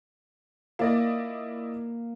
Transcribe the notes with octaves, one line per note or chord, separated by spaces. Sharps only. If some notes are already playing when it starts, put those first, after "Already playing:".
A#3 E4 D5 D#5